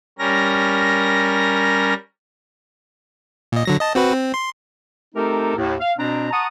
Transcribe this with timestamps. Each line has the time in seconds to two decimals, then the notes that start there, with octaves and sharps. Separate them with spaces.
0.19 G3 C#4 A#4 A#6
3.52 A#2 D#5
3.65 D3 F#3 A#6
3.80 D#5 A5
3.95 C4 F#4 B4
4.14 C4
4.34 C6
5.15 A3 C4 D#4 G4 A4 A#4
5.56 D#2 A2
5.80 F5
5.98 B2 C4 D4 A#5
6.31 F#5 A5 A#5 C#6 D#6